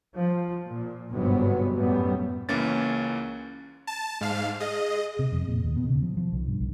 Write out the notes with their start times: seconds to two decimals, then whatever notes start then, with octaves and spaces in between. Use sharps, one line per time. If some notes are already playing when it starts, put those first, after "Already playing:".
0.15 F3
0.65 A#2
1.11 G1 G#2 C3 F#3 B3
1.74 F#2 A2 F#3 G3 B3
2.49 C#2 E3 A#3 C#4 A6
3.87 A5
4.21 G#2 F5
4.60 G#4 D#5
5.19 C3
5.32 F2
5.48 A#2
5.64 D#2
5.76 B2
5.88 C#3
6.02 F3
6.17 F3
6.32 B1
6.47 G2
6.60 B1